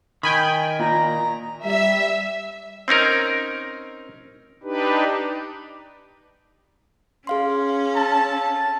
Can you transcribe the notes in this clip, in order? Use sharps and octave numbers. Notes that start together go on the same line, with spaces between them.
D#3 G5 G#5 B5
A#2 A#5
G3 E5
C4 C#4 D#4 A#4
D4 D#4 G4 B4
C#4 G#4 F5 C6
A4 A5